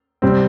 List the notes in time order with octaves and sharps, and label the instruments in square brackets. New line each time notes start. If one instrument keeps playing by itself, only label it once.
[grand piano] C3 G3 C4